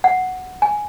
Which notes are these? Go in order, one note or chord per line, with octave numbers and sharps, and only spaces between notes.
F#5
G#5